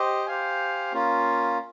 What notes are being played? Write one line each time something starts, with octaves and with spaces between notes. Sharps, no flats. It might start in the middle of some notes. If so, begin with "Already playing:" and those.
Already playing: G4 C5 D#5
G4 C5 F5 G#5
A#3 C#4 F4